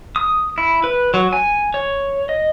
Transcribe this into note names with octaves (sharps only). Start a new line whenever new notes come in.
D#6
E4
B4
F#3
G#5
C#5
D#5